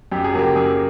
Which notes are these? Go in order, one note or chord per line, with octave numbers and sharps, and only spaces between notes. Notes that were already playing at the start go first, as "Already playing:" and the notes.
F#2 G4
G#4
C#3 F#3 A#3 G4
F#2 G#4